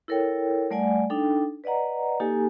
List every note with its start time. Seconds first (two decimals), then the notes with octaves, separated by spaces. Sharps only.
0.08 E4 A4 A#4 C#5 G5
0.71 G3 A3 D5 F#5 G#5
1.10 D4 D#4 A4 G5
1.64 B4 D5 D#5 F#5 A#5
2.20 A#3 D#4 G4 A4 G#5